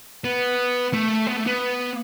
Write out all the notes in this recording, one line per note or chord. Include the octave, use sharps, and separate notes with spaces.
B3
A3
B3
A3
B3